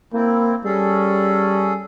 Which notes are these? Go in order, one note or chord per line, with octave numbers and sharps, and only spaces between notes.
A#3 C4 E4
G3 C#4 G#4 A4